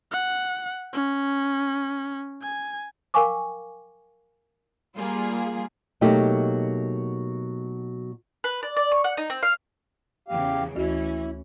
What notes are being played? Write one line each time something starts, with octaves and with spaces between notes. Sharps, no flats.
F#5
C#4
G#5
A#4 F5 G5 G#5 C#6 D6
G3 A#3 F4 G#4
B2 F#3 A3 A#3 D#4 G4
B4
D5
D5
C#6
F#5
D#4
C4
F5
E2 C#3 G4 F5
D2 E3 A3 C#4 E4 F#4